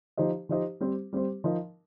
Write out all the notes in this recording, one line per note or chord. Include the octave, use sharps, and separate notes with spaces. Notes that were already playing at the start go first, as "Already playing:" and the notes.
F3 D#4 G4 C5 D#5
F3 D#4 G4 C5 D#5
G3 C4 G4 C5
G3 C4 G4 C5
F3 D#4 A#4 D#5